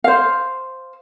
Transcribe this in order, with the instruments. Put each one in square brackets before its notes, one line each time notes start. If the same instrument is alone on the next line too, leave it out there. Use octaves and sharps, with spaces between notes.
[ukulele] C5 F5